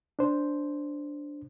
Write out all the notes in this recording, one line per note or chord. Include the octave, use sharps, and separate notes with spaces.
D4 C5